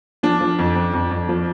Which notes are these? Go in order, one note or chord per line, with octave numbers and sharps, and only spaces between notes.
F3 D4
F3
F2
F2
F2
F2
F3